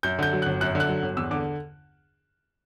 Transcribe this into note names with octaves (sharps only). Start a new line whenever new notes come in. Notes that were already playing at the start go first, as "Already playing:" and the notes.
F#2 G6
D3 G6
F#3
F#6
G1
F#2 F#6
D3
F#6
F#3
G1
E2 E6
D3 D6